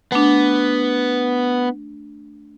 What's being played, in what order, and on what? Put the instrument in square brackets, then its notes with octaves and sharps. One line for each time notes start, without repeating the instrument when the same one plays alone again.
[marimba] A3 D4 [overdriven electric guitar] B3